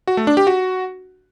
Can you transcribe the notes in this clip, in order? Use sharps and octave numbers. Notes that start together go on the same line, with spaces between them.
F#4
A3
D4
G4
F#4